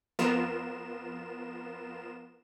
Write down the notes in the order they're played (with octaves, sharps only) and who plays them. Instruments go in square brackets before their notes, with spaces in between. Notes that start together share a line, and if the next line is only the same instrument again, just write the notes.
[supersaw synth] F2 B3 F4 A#4 E7